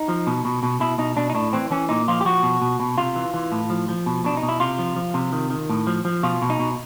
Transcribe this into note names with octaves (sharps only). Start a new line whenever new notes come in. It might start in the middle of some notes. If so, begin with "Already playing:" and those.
Already playing: D#4
F3
B2
B2
B2
B2 E4
B2 D#4
B2 D4
D#4
A2 D4
E3 C4
E3 C#4
A#2 D#4
F3 F4
G4
F3 F#4
B2
B2
B2
C3 F4
E3
E3
A2
F3
F3
B2
B2 D4
D#4
B2
E4
C3 F4
F3
F3
C3
D#3
D#3
A2
F3
F3
B2 F4
B2
D#4
B2